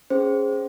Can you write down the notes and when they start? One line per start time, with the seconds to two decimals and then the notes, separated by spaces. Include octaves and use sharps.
0.10 C#4 G#4 C5
0.53 C#4